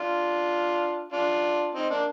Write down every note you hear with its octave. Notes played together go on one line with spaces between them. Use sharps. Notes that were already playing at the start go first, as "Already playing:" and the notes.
Already playing: D4 F4
D4 F4
C4 D#4
A#3 D4